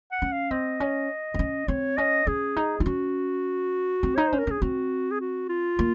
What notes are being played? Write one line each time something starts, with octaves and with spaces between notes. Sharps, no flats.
F#5
C#4
F5
C4 D#5
C#4
C4
C#4
C4 C#5
C#4 D#5
C#4 G#4
D#4
D#4 F4
C#4 F#4
C4
D#4 C#5
C5
C#4
A#4
C#4 G#4
C4 F#4
G#4
F#4
F4
A#3